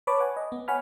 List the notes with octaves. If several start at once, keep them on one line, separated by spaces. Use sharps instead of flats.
B4 C#5 A5 B5 D6
F#5 G#5
D#5
B3
C#5 F#5 G#5 B5 F6